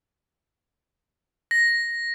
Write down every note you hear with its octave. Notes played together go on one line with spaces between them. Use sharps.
A#6